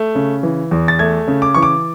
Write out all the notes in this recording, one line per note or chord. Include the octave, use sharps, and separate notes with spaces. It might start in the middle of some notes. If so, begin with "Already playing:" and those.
Already playing: A3
C#3
E3
E2
A6
A3 G#6
C#3
D6
E3 C#6
D6